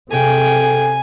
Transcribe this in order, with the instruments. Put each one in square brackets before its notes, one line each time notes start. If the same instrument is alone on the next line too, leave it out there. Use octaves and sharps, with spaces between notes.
[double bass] C3 [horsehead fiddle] G#4 G5 [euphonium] A4 [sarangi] G#5